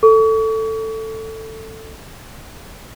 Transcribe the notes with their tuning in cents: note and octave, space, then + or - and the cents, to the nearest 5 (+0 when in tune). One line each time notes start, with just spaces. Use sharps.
A4 +10 C#6 +40